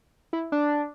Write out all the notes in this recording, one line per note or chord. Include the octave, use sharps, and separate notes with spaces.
E4
D4